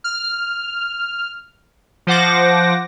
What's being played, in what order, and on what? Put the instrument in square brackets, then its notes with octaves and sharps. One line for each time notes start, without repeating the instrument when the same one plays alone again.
[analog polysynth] F6
F3 C5 F#5 D6 A#6